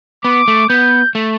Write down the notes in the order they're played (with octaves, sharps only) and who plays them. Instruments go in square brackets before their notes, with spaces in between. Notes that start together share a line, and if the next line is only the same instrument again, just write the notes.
[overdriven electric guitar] B3 [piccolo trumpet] D6
[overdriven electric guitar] A3
[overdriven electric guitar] B3 [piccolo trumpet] G6
[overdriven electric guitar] A3